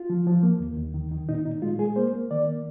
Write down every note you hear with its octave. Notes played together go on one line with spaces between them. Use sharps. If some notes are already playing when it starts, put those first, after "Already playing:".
Already playing: F4
F3
F3
A#3
D#2
D#2
D#3
D#3
A#2 D#4
A#2 D#4
G#3 F4
G#3 G#4
A#3 C5
A#3
D#3 D5
A#3